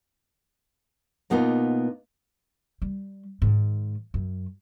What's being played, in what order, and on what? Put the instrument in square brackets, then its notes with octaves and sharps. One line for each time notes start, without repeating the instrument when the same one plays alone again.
[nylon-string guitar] B2 A#3 B3 D#4 F4
[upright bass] G3
G#2 D#3
F#2